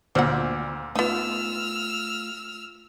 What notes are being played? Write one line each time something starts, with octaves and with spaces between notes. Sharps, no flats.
D2 A#2 C5 F#5 D6 E6 F6
A3 B3 D#4 F4 E6 F6